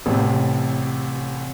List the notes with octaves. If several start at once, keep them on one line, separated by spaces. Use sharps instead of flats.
A1 A2 C3